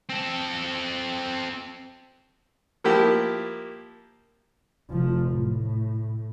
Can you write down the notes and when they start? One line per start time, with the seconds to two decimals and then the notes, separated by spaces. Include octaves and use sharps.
0.09 C4 A4
2.84 F3 A#3 E4 G4
4.90 F1 F3
5.33 A2